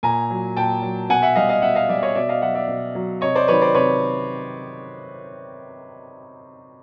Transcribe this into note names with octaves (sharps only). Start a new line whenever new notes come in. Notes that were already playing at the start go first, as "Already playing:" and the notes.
A#2 G#5 A#5
F#3
A#2 G5 A5
F#3
B2 F#5 G#5
E5 F#5
G3 D#5 F5
D#5 F5
B2 E5 F#5
D#5 F5
G3 D5 E5
C#5 D#5
B2 D5 E5
D#5 F5
F#3 E5 F#5
D5 E5
B2
F#3
C3 C#5 D#5
C5 D5
D#3 F#3 B4 C#5
C5 D5
C3 B4 C#5